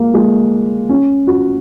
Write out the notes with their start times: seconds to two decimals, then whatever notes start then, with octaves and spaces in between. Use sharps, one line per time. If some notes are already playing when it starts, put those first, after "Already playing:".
Already playing: G#3 A#3
0.14 G#3
0.89 C#4
1.27 F#4